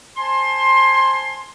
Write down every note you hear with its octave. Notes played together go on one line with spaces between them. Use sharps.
C5 G#5 A5 C6